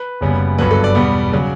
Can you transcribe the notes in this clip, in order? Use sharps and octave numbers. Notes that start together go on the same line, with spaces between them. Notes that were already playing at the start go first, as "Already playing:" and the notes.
Already playing: B4
F#1 F#2 C#3 G3 B3
G1 G2 F#3 B4
A4
D5
E2 B2 G3 B3
C#3 F#3